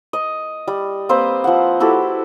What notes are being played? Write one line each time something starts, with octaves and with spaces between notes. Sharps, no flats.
D#5
G3
A#3 C4 B4 C5
F3 F#5
E4 F#4 G4 A4